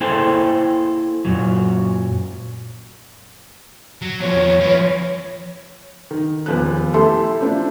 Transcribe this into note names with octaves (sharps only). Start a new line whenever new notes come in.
A#3 E4 G#4 A4 C5 G5
F#2 A#2 F#3
F#3
E2 F3 C#5
F3 B4
D#3
D#1 E2 F3 B4 F#6
A3 E4 G4 A4 C6
A3 C4 D4 E4 F4